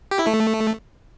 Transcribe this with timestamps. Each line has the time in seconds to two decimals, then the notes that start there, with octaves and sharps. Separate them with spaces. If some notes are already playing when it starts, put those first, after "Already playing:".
0.11 G4
0.19 E4
0.27 A3